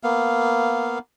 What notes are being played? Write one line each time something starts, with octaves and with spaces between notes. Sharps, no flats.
A#3 B3 F5